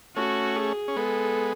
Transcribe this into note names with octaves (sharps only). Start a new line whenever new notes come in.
A3 C#4 F#4
G#4
C#4
G#3 B3 A4